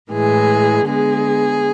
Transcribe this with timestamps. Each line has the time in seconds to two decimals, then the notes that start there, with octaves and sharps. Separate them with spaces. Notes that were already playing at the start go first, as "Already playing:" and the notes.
0.12 A2 E3 G#3 G#4
0.87 D3 G#3 B3 G#4